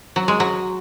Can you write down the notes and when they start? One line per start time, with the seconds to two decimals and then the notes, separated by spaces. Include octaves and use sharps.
0.16 F#3
0.28 G#3
0.40 F#3